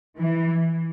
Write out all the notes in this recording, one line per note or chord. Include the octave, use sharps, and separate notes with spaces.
E3